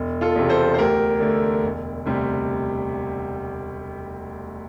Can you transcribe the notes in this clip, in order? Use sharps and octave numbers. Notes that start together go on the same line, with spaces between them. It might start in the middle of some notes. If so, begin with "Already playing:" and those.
Already playing: E1
F4 A4
E2 C3
A4 C5
C5
D2 G4 A#4
D3 A3
E1
D2 C3 G3